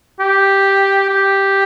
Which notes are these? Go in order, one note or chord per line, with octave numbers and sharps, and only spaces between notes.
G4
G4